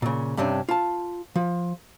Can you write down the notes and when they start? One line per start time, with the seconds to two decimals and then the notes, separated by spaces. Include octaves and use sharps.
0.02 A#2 C#3
0.37 G2 C3 C#4 D4
0.69 F4 A5
1.36 F3